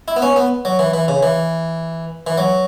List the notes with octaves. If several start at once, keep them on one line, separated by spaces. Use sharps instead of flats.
E4
B3
C#4
B3
F#3
E3
E3
C#3
E3
E3
F#3